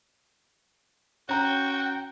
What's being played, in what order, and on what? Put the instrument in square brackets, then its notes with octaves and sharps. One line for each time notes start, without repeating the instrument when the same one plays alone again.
[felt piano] C#4 A#5 [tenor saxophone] F#4 [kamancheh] G5